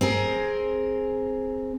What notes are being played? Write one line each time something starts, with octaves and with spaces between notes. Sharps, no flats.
C4 G#4 A#4